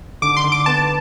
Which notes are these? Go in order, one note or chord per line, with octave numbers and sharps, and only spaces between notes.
D3 D6
C6
D3
D6
B3 A5